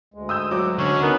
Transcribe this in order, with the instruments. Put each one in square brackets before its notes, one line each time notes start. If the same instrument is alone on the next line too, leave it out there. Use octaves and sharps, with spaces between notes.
[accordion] D2 G#3
[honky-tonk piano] D#6 E6 G6
F#3 D6
[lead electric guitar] D3 [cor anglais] C#4
[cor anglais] B3 [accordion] C#4 D#4 A#4